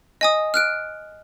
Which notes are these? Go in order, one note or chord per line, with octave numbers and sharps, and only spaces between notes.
D#5 G#5 D#6
F6 F#6 D7